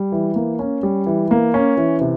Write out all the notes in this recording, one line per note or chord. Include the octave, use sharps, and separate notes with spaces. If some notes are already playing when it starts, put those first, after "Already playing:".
Already playing: G3
E3
A#3
C#4
G3
E3
A#3
C#4
E3
C3